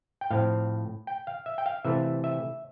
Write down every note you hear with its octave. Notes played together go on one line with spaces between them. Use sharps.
G5
A2 F3 C4 F5
G5
F5
E5
G5
F5
C3 E3 A3 E5
E5